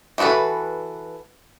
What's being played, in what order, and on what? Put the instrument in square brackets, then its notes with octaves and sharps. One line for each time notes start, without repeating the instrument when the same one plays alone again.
[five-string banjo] E3 D#4 F#4 A4 B4